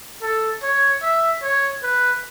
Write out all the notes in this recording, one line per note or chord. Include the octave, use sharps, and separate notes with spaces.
A4
C#5
E5
C#5
B4